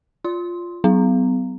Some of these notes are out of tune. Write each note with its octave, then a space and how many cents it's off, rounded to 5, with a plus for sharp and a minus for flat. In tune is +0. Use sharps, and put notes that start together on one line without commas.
F4 +0 C6 +0
F#3 +40 B3 +40